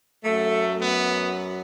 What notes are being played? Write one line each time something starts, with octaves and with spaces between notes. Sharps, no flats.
F#2 F#3 A3
B3